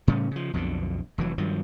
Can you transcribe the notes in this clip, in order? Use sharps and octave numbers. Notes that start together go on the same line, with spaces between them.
A2 C#3 G3 C#4
C#3 F3
B1 F2 B2 D3
F1 E3 F#3
G2 D#3 F3 F#3